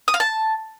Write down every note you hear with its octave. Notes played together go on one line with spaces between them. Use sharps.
D#6
F5
A5